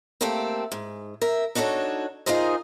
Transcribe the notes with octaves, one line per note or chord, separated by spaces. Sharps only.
A3 A#3 C4 G4 A4
G#2
A#4 E5
D4 D#4 F#4 A4 C#5
D#4 F4 G#4 A#4 C5 D#5